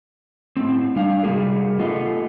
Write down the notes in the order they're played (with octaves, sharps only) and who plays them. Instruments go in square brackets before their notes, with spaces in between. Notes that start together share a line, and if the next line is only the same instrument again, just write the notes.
[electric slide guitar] A2 C4
G3 D4 F5
C3 G3 B3 F#4 G#4 A#4
A3 B3 F4 G4 D#5